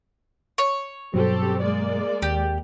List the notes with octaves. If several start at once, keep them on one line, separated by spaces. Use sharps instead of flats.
C#5
G2 B2 F#3 C4 G4 A4
G#3 A#3 D5
D#2 G4